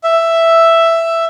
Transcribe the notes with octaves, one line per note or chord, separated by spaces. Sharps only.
E5